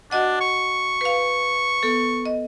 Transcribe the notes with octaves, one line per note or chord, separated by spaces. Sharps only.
D4 F#4 D#5 F#5
C#6
B4 F5
B3 A4
D#5